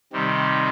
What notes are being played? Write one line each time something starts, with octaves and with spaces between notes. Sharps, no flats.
C3 D#3 G3